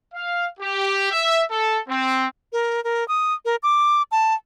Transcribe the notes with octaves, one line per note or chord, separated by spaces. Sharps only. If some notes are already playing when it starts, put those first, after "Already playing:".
F5
G4
E5
A4
C4
A#4
A#4
D#6
A#4
D6
A5